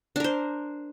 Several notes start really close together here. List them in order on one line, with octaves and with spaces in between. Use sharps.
D4 A#4 C5